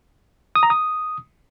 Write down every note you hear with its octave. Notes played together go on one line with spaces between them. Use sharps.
D#6
A#5
D#6